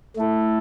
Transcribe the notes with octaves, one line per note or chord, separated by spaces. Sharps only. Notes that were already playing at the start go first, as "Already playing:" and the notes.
A3 E4 A4